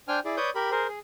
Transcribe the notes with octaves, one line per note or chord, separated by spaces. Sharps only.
D4 C5 G5 G#5 F6
E4 G#4 D5
B4 C#5 D5 D#6 G6
G4 A#4 B5
G#4 A#4 C5
G#4